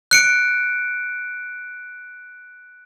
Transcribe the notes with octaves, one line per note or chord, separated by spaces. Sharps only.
F#6 C#7 D7